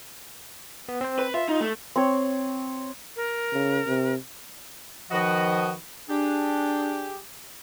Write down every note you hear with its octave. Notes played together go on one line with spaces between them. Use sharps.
B3
C4 C5
B4
F4 E5
D#4
A3
C4 C#5
A#4
C#3
C3
D#3 F3 F#4 B4 D#5
D4 G4 G#4